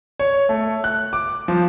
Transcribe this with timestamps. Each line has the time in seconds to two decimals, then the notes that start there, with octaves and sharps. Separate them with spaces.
0.20 C#5
0.49 A3
0.84 F#6
1.13 D6
1.48 F3